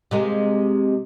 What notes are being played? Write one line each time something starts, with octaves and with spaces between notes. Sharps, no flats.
C3 G#3 A#3